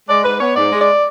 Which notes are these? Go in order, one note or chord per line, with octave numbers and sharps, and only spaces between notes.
G#3 D5
G#2 B4
B3 C#5
G#2 D5
G#3
D5